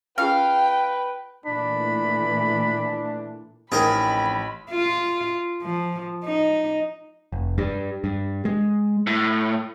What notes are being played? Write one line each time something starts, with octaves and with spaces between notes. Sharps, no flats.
C#4 F4 G#4 B4 F5 G5
A#2 E3 A3 D4 B5
A1 F2 D#4 G#4 A#4 G5 B5
F4
F3
D#4
F1
G2
G2
G#3
A2